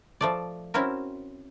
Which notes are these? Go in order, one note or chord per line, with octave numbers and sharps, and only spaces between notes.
F3 A3 D5
C4 C#4 E4 F#4 A#4